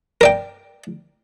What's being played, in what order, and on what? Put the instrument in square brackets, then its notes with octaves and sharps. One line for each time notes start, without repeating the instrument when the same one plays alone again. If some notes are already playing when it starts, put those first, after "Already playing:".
[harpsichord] A#4 D5 G5